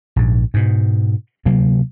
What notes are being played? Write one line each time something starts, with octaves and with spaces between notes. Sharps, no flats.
A#1 G#2
G#2 B2
D2 C3 F#3 A#3